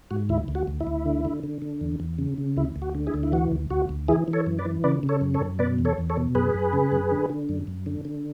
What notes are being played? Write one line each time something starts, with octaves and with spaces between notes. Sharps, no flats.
G#2 F#4
D2 E4
D2
F#4
D2
E4
D2
D3
D3
D3
D3
E2
E2
C#3
C#3
D2 E4
D2
F#4
D3
E4 G#4
D2
E4
E3 F#4
D2
D2 F#4
D2
E3 E4 G#4
E3
A4 C#5
F#2
B4 D5
E3
C#3 B4 D5
C#3
A4 C#5
F#2
A4 C#5
F#2
B2 B4 D5
E2
A4 C#5
E2
A4 C#5
B2
F#2 G#4 B4
F#2
C#3
F#2
D3
D3
F#2
F#2
D3
D3